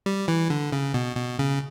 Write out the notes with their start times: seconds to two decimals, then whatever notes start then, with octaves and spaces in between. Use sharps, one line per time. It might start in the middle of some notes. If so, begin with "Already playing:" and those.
0.06 G3
0.28 E3
0.50 D3
0.72 C#3
0.94 B2
1.16 B2
1.39 C#3